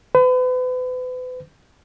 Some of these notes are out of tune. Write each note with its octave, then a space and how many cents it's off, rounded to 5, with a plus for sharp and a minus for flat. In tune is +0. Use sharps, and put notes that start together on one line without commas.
B4 +40